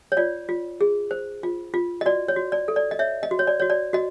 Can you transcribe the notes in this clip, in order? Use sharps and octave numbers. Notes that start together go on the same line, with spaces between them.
C#5
F4 D5
F4
G#4
C5
F4
F4
D#5
F#4 D5
C#5
F#4
D5
A4
D5
D#5
C#5 E5
D#5
F#4
C#5
D5
F#4 C#5
D5
F#4 D#5